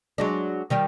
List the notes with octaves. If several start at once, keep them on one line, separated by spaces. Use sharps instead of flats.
F#3 G#3 D4
D#3 G3 G4